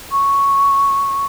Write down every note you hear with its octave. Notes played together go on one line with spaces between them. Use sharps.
C#6